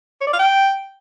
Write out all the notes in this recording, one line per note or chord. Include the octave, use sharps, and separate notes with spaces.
C#5
D5
F5
G5